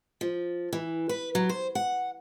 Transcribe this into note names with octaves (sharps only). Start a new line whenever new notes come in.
F3
E3
B4
F#3
C5
F#5